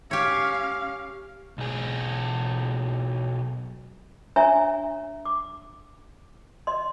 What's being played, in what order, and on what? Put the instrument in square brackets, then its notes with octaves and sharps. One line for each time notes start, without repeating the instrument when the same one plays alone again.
[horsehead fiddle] C#4 F5 [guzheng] G4 C#5
[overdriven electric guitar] B1 G#4
[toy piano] D4 C#5 E5 G#5 A#5
D6
D#5 C6